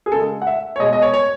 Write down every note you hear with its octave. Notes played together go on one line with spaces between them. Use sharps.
G#4
C#3 G#3 A4
F#5
E5
C#5
B2 G#3 D#5
D#5
C#5
C#5